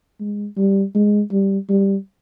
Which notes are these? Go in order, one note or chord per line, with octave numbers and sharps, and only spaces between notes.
G#3
G3
G#3
G3
G3